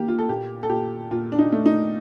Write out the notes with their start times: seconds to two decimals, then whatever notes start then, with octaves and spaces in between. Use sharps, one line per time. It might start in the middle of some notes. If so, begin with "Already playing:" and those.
Already playing: D#3 A#3 G4
0.08 F4
0.19 A4
0.29 A#2 G4
0.63 A4
0.69 A#2 G4
1.11 A#2 F4
1.32 D4
1.39 D#4
1.52 A3
1.66 D#4